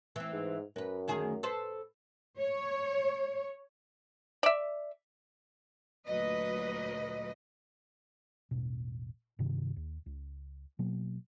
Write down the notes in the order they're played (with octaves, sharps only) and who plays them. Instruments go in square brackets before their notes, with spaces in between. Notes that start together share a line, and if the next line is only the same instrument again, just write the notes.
[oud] E3 C4
[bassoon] G#2
[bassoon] F#2 [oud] F#4 B4
[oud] D2 D#3 G#4
A4 B4 C5
[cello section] C#5
[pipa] D5 E5
[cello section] D2 A#2 F#3 B4 D#5
[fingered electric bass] E1 A1 B2
G2 C3 D#3
D#2
C#2
B2 F#3 A#3